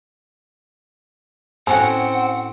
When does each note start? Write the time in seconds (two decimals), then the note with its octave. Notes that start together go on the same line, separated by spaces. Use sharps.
1.67 A2 C4 C#4 F#4 F#5 G#5